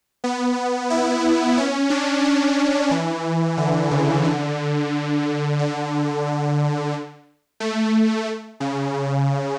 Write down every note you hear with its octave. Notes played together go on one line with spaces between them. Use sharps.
B3
E4
C#4
D4
D4
E3
D3
C#3
D3
D3
A3
C#3